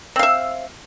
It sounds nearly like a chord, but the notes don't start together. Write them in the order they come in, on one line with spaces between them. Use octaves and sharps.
C4 F5 E5